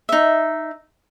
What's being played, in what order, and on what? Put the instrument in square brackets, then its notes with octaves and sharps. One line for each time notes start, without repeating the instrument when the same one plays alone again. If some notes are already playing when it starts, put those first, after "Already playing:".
[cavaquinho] D#4 E5